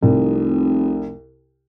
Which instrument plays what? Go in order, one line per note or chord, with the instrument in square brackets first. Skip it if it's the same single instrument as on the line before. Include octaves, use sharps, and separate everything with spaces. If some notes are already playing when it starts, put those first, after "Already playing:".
[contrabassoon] F1 [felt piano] C2